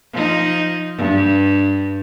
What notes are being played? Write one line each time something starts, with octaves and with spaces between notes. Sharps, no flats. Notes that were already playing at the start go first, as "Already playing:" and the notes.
F3 D#4
G2